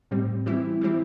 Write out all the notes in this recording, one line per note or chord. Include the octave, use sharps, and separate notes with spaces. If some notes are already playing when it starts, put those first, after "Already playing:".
A2 G3 C4
E3 G3 C4 E4
E3 G3 C4 E4